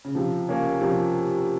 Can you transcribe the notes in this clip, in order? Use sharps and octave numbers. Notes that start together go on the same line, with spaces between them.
C#3
C3 F3
A#3 C#4
C3 F3